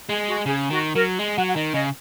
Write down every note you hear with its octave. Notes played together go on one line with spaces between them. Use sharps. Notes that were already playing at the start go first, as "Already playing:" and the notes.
G#3 G#4
F#4
C#3 G#4
D#3 F#4
F#3 A#4
G#3
F#3 F#5
F#5
D#3 D#5
C#3 D#5